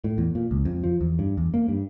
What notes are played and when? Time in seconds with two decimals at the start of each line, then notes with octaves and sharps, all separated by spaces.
0.04 A2
0.18 E2
0.35 A#2
0.51 C#2
0.65 F2
0.84 F3
1.01 E2
1.19 G2
1.37 E2
1.54 A#3
1.68 G2